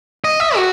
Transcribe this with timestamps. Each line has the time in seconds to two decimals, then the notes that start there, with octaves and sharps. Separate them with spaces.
0.24 D#5
0.40 E5
0.56 F#4